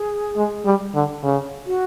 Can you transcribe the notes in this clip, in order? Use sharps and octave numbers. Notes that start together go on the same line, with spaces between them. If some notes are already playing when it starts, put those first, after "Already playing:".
Already playing: G#4
G#3
G3
D3
C#3
F#4